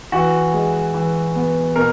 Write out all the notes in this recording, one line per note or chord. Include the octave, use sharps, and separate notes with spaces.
E3 F#4
G#3
E3
B3
B2 A#4